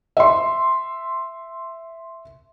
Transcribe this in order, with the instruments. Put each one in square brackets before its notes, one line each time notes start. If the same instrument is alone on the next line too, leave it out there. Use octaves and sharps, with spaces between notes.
[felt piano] E5 C6